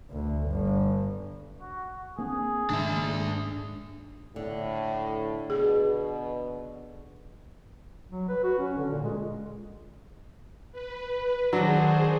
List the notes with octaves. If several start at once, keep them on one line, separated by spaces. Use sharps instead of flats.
D2
G1
F#4
A#3 C4 D4 G#4
G#2 D#3 G#3 A#3 D4 E5
A2 D3
B2 G#4
F#3
B4
F#4
C#4
D3
A#2
G#3
B4
D#3 F#3 D4 F#4 G#4 C5 D5